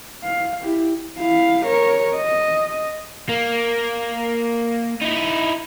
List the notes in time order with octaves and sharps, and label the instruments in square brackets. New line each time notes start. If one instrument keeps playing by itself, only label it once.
[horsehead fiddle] F5
E4 G4
E4 F5
A#4 C#5
D#5
[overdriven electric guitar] A#3
D#4 E4